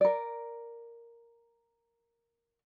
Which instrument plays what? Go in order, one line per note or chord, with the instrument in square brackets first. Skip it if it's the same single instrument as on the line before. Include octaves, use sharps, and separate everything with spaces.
[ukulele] A#4 D5